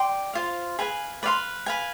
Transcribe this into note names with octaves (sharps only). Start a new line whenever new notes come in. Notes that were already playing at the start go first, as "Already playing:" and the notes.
Already playing: D5 G5 C6
F4 C5 F5
G#4 B4 F5 G#5
B4 D5 F5 C6
B4 F5 G#5